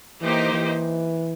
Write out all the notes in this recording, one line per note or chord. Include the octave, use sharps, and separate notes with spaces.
E3 A#3 D#4 G4 C5
E3